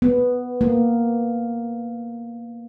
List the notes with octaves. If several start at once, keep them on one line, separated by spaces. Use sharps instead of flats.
B3
A#3